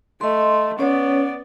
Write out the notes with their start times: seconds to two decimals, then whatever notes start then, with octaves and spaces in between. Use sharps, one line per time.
0.21 A3 D#5 C6
0.79 B3 C#4 C#5 D5